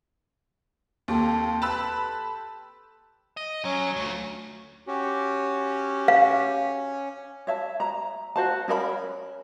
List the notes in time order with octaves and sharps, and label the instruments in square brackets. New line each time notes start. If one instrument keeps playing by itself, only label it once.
[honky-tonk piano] D#2 [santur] C4 G4 A4
[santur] B4 D#6 [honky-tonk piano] A5 B5 E6
[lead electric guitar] D#5
[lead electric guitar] F#3 [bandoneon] C#4 C#5
[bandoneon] D2 [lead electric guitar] A3 F4
[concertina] C#4 [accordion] F#4 G4
[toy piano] F5
[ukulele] C#5 E5 A5
A#5
F#4 C5 A5
C#4 A#4 D#5 B5